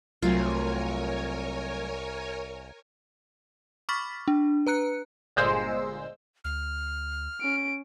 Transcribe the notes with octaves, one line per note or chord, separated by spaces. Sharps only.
C2 F#3 A3 C4 F4 A#4 C#5 G#5
B5 C#6 D6 F6 A6 B6
D4
B4 A#5 F#6 C#7
G1 A#2 G#3 C5 E6
D2 F6
C#4 D7